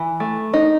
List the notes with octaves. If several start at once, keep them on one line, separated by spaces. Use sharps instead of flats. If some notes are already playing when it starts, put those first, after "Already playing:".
Already playing: E3
A3
D#4